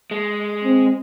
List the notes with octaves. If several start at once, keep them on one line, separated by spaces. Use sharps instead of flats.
G#3
C4